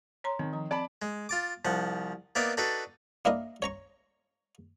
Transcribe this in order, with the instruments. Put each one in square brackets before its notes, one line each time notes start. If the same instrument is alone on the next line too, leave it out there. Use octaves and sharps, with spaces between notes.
[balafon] C#5 A#5 C6
[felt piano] D#3 [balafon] C4
[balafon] F3 A#5
[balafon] C4 [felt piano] D5 A5 B5
[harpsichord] G#3
F4 A5 D6
C2 F3 F#5
A#3 B3 D#4 A#4 D5 E5
D4 D#4 F#4 A4 B4
A#3 D4 E4 A#4 D#5
C#5 A#5 C#6